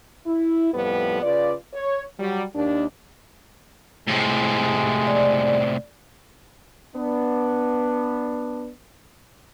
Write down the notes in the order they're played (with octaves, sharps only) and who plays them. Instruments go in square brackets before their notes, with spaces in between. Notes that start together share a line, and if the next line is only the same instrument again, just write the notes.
[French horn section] E4
F2 A2 F3 G3 B3 B4
C#3 F4 B4 D5
C#5
F#3 G3
D#2 D4
[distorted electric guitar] A2 C3 [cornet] G#3
[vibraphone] D5
[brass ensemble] B3 D4